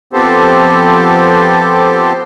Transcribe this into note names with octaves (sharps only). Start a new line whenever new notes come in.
F3 B3 C4 G4 A4 C5